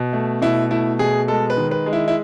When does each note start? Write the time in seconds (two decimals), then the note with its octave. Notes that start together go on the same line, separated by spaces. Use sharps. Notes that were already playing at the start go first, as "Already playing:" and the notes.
Already playing: B2
0.13 A3
0.42 B2 E4
0.70 A3 E4
0.99 B2 G#4
1.28 G#3 A4
1.50 B4
1.57 D#3
1.71 B4
1.86 G#3
1.93 E4
2.08 E4